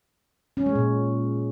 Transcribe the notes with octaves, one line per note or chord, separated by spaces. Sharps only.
C#4
G#3
A#2